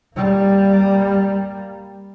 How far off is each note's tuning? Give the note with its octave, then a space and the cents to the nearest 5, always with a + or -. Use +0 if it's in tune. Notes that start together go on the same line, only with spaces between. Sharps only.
G3 +0 A#3 +0